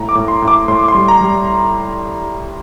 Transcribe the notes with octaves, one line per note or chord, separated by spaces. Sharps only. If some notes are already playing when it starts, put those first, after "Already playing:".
Already playing: A2 A#5
D6
A2
C6
A2
D6
A2 C6
D6
C6
G3
A#5
G3